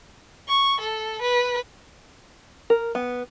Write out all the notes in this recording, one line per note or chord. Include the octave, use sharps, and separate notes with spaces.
C#6
A4
B4
A#4
B3